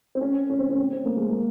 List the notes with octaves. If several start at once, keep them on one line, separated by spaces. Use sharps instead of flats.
C4
C#4
C#4
C4
C#4
C4
C4
A#3
G#3
A#3